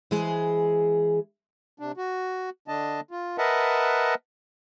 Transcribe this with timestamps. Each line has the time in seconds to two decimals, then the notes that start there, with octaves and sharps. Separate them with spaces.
0.11 E3 G#3 G#4 C5
1.79 C3 D4
1.97 F#4
2.68 D3 D4 D#5 A5
3.11 F4
3.38 A#4 B4 D#5 E5 F#5 A5